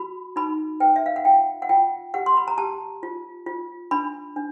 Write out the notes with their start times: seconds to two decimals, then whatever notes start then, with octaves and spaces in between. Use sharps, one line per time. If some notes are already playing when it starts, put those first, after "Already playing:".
Already playing: F#4 B5
0.36 D#4 B5
0.80 B4 G5
0.96 E5
1.06 F5
1.16 F#5
1.25 F4 G5
1.62 F#5
1.69 F4 G5
2.14 G4 F#5
2.26 C6
2.37 B5
2.48 A#5
2.58 G4 A5
3.03 F4
3.46 F4
3.91 D4 B5
4.36 D4